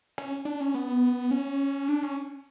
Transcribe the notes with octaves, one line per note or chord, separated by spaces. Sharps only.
C#4
D4
C#4
B3
C#4
D4
C#4